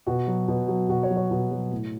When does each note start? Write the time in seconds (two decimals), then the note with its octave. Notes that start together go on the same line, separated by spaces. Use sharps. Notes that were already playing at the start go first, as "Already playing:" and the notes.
0.07 B2 F#4
0.27 F#3
0.48 B2
0.68 F#3
0.89 B2 F#4
1.03 C#5
1.10 F#3
1.17 C#5
1.31 B2
1.51 F#3
1.72 A2